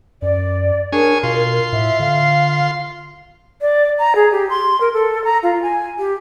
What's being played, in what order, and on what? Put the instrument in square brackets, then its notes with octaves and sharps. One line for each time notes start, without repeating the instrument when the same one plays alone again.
[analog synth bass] F#2 [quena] D5
[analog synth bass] D4 [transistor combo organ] G#4 C#5 G#5 [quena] A#4
[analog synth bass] B2 [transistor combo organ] F4 C6
[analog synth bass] A2 [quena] E5
[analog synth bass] D3 [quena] F5
[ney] D5
A#5
G#4
G4
C6
A#4
A4
A#5
F4
G#5
G4